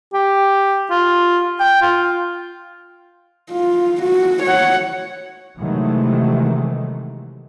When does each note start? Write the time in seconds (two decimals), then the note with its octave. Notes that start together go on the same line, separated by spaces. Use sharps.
0.14 G4
0.90 F4
1.60 G5
1.82 F4
3.51 F4
4.02 F#4
4.42 C#5 F#5
5.58 C3 D#3 E3 F#3 G#3 A3